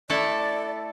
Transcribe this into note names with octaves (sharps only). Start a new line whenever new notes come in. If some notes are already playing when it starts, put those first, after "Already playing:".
A3 E4 A4 D5